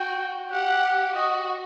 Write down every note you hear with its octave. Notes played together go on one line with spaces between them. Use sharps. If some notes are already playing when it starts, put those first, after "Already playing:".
Already playing: F#4 G5
G4 F#5
F#4 D#5